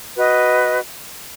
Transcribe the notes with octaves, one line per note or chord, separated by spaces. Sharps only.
F#4 B4 D#5